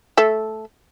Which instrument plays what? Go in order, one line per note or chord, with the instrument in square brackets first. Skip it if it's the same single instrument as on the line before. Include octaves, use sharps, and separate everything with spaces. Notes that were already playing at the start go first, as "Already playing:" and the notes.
[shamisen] A3 A4 E5